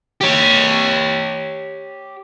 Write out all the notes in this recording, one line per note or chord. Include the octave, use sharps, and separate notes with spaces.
G4 C#5